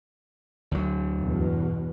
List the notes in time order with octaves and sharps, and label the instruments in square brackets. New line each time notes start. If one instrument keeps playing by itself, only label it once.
[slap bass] D2 F#3
[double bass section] E2 G2 B2